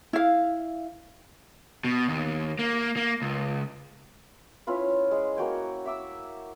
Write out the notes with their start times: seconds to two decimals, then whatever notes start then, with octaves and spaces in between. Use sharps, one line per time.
0.13 E4 F5
1.84 B2
2.09 D#2
2.59 A#3
2.97 A#3
3.22 C#2
4.67 C#4 E4 F4 B4
5.11 G#3
5.37 A#3 F#4 G5 G#5
5.86 E5 D6 E6